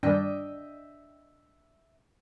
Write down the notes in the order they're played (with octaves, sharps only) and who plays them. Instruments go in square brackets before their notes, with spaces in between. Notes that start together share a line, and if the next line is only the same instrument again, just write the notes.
[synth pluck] G2 D#3 G3 [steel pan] D4 [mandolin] D#5 E5 G5